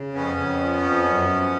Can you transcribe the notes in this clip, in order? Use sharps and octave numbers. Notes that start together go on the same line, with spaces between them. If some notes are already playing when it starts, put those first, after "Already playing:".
Already playing: C#3
F2 B3 C#4
F2
F3
F2
F#2
F3